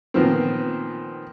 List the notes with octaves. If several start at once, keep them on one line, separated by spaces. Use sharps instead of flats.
A#2 D#3 F3 B3 C4